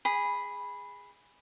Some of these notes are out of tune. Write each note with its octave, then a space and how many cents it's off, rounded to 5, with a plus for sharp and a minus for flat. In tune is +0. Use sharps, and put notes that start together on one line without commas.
G#4 -15 B5 +0